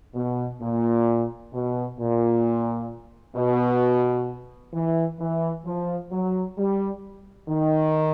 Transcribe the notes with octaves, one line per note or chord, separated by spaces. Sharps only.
B2
A#2
B2
A#2
B2
E3
E3
F3
F#3
G3
D#3